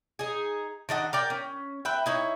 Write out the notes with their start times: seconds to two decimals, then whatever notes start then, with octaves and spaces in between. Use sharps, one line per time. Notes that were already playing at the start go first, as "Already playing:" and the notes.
0.19 D#4 G#4
0.89 D#3 D4 D#5 F#5
1.13 A#4 D5 G5
1.30 C#4
1.85 B4 E5 G5
2.06 D#4 E4 C#5